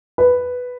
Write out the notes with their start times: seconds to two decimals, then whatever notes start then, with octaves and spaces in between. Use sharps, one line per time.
0.18 B4